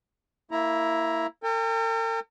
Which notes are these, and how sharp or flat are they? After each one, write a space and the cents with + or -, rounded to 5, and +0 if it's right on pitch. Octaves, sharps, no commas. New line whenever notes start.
A#3 -20 E4 +0 A#5 +15
A#4 -45 G5 +40